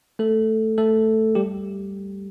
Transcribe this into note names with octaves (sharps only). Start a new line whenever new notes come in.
A3 A4
A3 A4
G3 G4